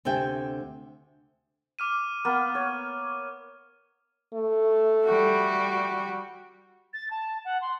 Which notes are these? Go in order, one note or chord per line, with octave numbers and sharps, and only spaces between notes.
D2 C3 E5 G5 G#5
D6 F6 D#7
A#3 B3
C#5
A3
G3 F#4
A6
A5
F#5
C6